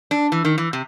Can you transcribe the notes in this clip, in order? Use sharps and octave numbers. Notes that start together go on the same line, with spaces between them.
D4
E3
D#3
E3
C3